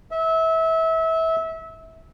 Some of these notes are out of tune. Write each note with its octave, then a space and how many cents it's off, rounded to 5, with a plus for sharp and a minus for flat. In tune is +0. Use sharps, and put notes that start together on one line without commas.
E5 -25